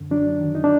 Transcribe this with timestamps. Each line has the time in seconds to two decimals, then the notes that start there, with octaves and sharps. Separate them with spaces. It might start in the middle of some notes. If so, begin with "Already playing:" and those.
Already playing: F#2 D3
0.11 F#3 D4
0.40 D#3
0.55 D#4
0.64 D4